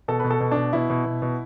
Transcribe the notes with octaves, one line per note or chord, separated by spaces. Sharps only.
B2 A4
B2 B4
A4
B2
B2 D4
B2 E4
B2
B2
B2